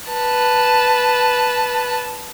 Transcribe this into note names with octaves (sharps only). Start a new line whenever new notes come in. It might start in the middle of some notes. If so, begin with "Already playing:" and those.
B4 A5